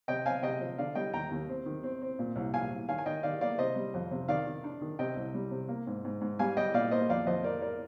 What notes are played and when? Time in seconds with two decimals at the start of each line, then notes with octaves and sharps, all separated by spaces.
0.08 C3 D#5 G5
0.26 C4 F5 G#5
0.43 C3 D#5 G5
0.61 F3
0.78 D3 D5 F5
0.95 G3 D#5 G5
1.13 D#2 G5 A#5
1.31 D#2
1.49 C4
1.66 D#3
1.83 C4
2.02 C4
2.19 A#2
2.36 C2
2.54 A#2 F5 G#5
2.71 C2
2.88 D#3 F5 G#5
2.98 G#5
3.06 D#3 D#5 G5
3.23 D#3 D5 F5
3.41 A#3 D5 F5
3.58 C3 C5 D#5
3.76 G3
3.94 F2
4.11 C3
4.28 D#3 D5 F5
4.46 D#3
4.64 D4
4.81 D#3
4.99 C3 D#5 G5
5.16 C2
5.34 G3
5.51 C3
5.69 A#3
5.87 G#2
6.04 G#2
6.21 G#2
6.39 G3 F5 G#5
6.57 G3 D#5 G5
6.74 A#2 D5 F5
6.91 A#3 C5 D#5
7.09 F2 D5 F5
7.27 F2 C5 D#5
7.44 F2 A#4 D5
7.61 A#4 D5